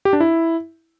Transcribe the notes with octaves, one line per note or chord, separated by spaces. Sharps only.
G4
D4
E4